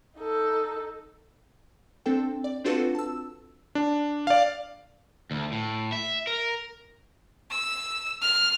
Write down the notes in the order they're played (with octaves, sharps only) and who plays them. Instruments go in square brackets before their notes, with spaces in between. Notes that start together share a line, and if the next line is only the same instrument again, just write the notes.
[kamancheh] D#4 A4
[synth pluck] C4 D4 A4 G5
D5
C4 D4 F4 F#4 A4 B4
A5 E6
[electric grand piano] D4
D5 F5
[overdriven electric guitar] D2
A2
E5
A#4
[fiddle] E6
F6